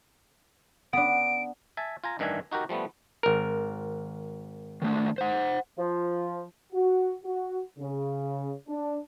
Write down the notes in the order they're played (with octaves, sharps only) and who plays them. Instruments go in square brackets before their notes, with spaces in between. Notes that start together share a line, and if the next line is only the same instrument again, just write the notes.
[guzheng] B3 D4 [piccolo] D7
[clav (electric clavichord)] E5 G#5 A5
F4 G#5 A#5
A1 G2 D#3 D4 E5 G#5
D#4 F#4 G4 A#4
F3 G3 A3 B3
G#1 A#4
[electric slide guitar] D#3 A3 D4
C5 F#5
[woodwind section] F3
[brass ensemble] F#4
F#4
C#3
D4